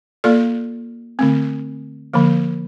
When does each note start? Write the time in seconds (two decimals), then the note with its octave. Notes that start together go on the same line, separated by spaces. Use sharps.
0.24 A#3 F4 A4 D5
1.19 D3 A3 C4
2.14 D3 F3 A#3